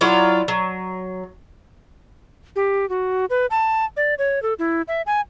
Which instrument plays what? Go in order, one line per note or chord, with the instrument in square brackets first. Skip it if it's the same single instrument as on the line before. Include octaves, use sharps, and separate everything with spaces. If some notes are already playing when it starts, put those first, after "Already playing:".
[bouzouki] F#3 E4 F4 D5
F#3
[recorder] G4
F#4
B4
A5
D5
C#5
A4
E4
E5
G#5